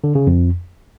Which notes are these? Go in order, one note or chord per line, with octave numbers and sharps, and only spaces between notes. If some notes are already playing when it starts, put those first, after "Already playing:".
D3
C#3
F2